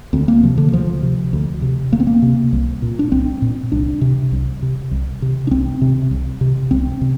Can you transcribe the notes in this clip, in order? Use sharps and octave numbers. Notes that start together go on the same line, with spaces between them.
D2 C4
A#3
C3 F3
D3
D2 F3
C3
D2
C3
D2 A#3
C4
A#3
C3
C2
A#2
D4
C2 C4
A#2
C2 D4
C3
C2
C3
C2
C3
D4
C2 C4
C3
C2
C3
C2 C4
C3